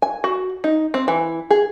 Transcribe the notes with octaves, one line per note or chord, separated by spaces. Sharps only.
G#5
F#4
D#4
C4
E3
G#4